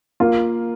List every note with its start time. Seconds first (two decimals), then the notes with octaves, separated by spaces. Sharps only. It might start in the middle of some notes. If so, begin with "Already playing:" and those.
0.20 A#3 F4